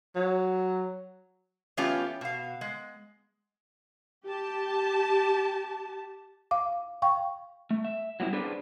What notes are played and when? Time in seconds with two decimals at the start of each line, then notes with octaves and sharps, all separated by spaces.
0.16 F#3
1.77 E3 A3 B3 C#4 F4 G4
2.21 B2 F5
2.61 G#3
4.26 G4 A5
6.51 F5 D6
7.02 F5 G5 C#6
7.71 A3
7.84 E5
8.20 F#3 G3 B3 E4
8.33 D4 G#4 A4 B4 C5 D5